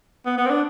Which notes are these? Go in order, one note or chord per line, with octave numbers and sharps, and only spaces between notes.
B3
B3
C4
D4